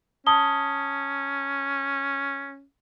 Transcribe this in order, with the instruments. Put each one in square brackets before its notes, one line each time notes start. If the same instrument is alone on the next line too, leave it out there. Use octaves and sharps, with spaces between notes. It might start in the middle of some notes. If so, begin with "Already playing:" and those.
[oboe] C#4 [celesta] A5 D#6 G7